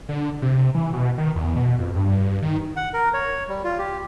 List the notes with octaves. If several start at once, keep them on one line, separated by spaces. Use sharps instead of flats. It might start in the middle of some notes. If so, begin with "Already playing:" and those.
D3
C3
E3
B2
D#3
E2
B2
F2
G2
D#3
F#5
A#4
C#5
G3
F4
G4